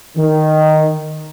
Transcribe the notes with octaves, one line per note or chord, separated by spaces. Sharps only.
D#3